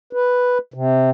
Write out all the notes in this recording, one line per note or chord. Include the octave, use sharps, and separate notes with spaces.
B4
C3